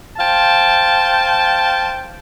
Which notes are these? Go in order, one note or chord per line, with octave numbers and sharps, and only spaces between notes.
C5 F5 G5 A5